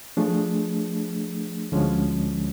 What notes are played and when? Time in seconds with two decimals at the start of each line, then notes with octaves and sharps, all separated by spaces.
0.17 F3 A3 D4 G#4
1.72 D2 D3 F3 G#3 C#4